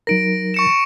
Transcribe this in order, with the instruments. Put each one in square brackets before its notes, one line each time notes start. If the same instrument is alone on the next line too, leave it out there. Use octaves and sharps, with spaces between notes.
[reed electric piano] F#3 D#4 A#4 [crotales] A#6 D7
[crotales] C#6 C#7 E7